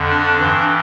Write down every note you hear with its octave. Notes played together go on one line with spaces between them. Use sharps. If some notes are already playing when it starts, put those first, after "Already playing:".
Already playing: F2 D3
D4
G2 E3